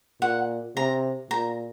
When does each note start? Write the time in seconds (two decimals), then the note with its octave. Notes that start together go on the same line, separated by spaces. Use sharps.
0.22 A#2 F#5
0.77 C3 A#5
1.31 A#2 A#5